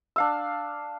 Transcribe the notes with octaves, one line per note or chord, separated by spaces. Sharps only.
D4 F5 E6